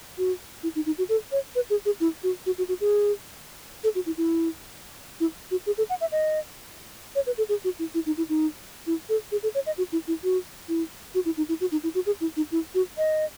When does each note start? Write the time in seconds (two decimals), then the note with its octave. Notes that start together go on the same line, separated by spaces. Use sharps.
0.18 F#4
0.63 E4
0.75 D#4
0.86 D#4
0.98 F#4
1.09 A4
1.32 C#5
1.55 B4
1.70 G#4
1.85 G#4
2.00 E4
2.23 F#4
2.46 F#4
2.58 F#4
2.69 F#4
2.81 G#4
3.84 A4
3.95 F#4
4.06 E4
4.18 E4
5.20 E4
5.51 F#4
5.66 G#4
5.78 A4
5.90 F#5
6.01 E5
6.12 D#5
7.15 C#5
7.26 B4
7.38 A4
7.49 G#4
7.64 F#4
7.79 E4
7.94 E4
8.06 D#4
8.17 E4
8.29 D#4
8.87 E4
9.09 A4
9.32 G#4
9.43 A4
9.55 C#5
9.66 D#5
9.78 F#4
9.92 E4
10.08 E4
10.24 F#4
10.69 E4
11.15 F#4
11.25 E4
11.37 D#4
11.49 E4
11.61 F#4
11.72 D#4
11.83 E4
11.95 F#4
12.06 G#4
12.21 E4
12.37 D#4
12.52 E4
12.75 F#4
12.98 D#5